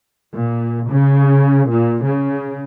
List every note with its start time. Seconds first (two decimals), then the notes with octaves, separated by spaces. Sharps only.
0.34 A#2
0.88 C#3
1.69 A#2
2.04 C#3